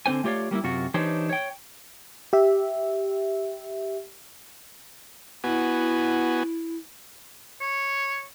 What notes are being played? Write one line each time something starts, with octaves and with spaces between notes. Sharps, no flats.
D3 C4 C5 G#5
A3 F4 G4 C#5 D5 F5
G3 A#3 D#4 E4
F#2 C3 F4 F#4
E3 D4 D#4 G4 C5 C#5
C#5 G5
G4 E5
B3 E4 F#4 G#5
C#5